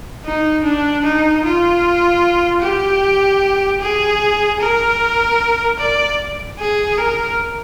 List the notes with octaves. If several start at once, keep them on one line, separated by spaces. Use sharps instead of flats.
D#4
D4
D#4
F4
G4
G#4
A#4
D5
G#4
A#4